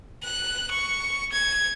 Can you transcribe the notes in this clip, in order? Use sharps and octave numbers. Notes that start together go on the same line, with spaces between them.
F#6
C#6
G#6